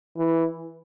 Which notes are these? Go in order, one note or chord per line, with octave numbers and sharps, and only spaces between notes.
E3